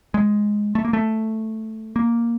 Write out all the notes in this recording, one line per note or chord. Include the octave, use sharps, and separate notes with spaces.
G#3
A3
A#3
A3
A#3